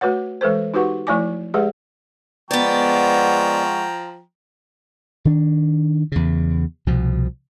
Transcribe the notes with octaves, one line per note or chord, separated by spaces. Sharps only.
A3 F#4 B4 C#5 F#5
E3 G#3 A4 B4 C5
D#4 F#4 G4 B4 F#5 C#6
F3 A3 E4 D5 G#5 D6
G#3 G4 G#4 B4 D5 F#5
F3 G#3 B3 D5 F#5 G5 A#5 C#6
D#3 D4
E2 C#3
C2 B2 F3